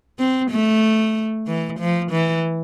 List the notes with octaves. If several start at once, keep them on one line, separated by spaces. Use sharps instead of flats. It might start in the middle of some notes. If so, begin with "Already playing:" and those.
C4
A3
E3
F3
E3